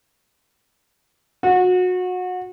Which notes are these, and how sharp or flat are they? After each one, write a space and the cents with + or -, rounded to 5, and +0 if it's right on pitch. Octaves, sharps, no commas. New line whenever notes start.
F#4 -25